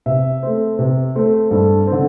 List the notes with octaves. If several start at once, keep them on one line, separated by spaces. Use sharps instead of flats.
C3 E5
A3 C4
C3
A3 C4
G2 A4
C4
D3